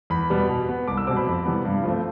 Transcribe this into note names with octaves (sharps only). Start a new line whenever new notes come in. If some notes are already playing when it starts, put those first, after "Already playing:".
E2 B5
B2 G3 B3
B2
B3
C2 D6
E6
B2 G3 C4 D6
B5
F2
C3 E3 G3 B3
G2
F3 A3 C4